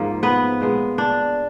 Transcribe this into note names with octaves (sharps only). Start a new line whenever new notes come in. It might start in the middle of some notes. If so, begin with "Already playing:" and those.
Already playing: G#2 F3 A#3
B3 B4
A#2 G#3 B3
D4